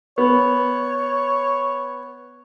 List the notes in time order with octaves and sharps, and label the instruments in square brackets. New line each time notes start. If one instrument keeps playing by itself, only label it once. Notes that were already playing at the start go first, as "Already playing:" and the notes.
[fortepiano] B3 [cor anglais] C#5